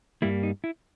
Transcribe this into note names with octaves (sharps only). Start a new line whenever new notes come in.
G2 G3 A#3 E4
D#4
E4